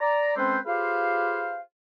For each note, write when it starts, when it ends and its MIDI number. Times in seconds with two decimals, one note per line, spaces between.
0.01 0.36 74
0.01 0.36 82
0.36 0.59 56
0.36 0.59 60
0.36 0.59 61
0.36 0.59 69
0.36 0.59 71
0.36 0.59 72
0.66 1.59 65
0.66 1.59 67
0.66 1.59 68
0.66 1.59 71
0.66 1.59 72
0.66 1.59 77